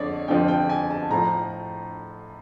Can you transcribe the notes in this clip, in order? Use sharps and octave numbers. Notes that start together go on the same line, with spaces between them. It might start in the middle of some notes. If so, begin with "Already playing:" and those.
Already playing: F2 D3 F3 C#5 D5
F2 D3 F3 G5
G5
G#5
A5
A2 F3 A#5